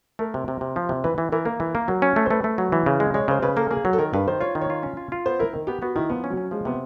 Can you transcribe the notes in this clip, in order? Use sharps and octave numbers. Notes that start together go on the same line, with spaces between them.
A3 A#4
C3
C3
C3
F3
C3
E3 B4
E3
E3 A#4
A#3 A#4
E3
A#3
F#3
C#4
A3
C5
A3 B4
A3
F#3
E3
C#3
G#3
G#3 C#5
C#3 C5
C#3 B4
A#3 A4
A#3 G#4
F#3
A4
D#3 A#4
G2 B4
D#3 C5
F4 C#5
D#3
C#5
F4
C#4
F4
F4
B3 C5
E4 A#4
D#3
B3 G4
B3 F#4
D#3 E4
F3 B3
C#4
F#3
C#4
F3 G#3
C3 B3